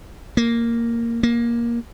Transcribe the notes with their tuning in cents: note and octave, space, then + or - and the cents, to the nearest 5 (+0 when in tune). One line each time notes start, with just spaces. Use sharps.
A#3 -5
A#3 +15